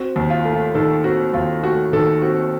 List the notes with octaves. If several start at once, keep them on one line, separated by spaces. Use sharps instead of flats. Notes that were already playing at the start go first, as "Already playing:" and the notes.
Already playing: C4 F#4
D#2
F4
A3
F4
D#3 A4
C4 F#4
D#2 F4
A3 F#4
D#3 A4
C4 F#4